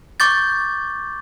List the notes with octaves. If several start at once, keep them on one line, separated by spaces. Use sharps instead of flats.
C#6 D6 G6 A6